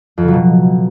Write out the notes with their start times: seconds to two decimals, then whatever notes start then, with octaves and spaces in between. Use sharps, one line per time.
0.18 F2
0.23 C#3
0.28 F#3
0.33 B2